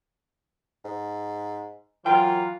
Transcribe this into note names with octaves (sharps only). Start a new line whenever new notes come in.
G#2
E3 F#3 F4 A#4 G5